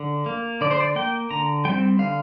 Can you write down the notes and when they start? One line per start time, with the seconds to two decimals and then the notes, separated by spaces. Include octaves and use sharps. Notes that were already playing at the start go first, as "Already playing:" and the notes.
Already playing: D3
0.26 A#3
0.61 D3 D5
0.71 C5
0.80 D5
0.96 A#3 G5
1.31 D3 A#5
1.65 G3 C4 G5
1.99 D3 F5